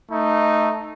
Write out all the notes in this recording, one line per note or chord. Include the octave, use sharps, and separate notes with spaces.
A3 D#4